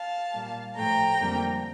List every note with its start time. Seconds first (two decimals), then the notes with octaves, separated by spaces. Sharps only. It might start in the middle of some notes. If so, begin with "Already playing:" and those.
Already playing: F5 A5
0.33 A#2 G3 A#3
0.76 A2 F3 A3 G5 A#5
1.20 F2 D3 G3 A#3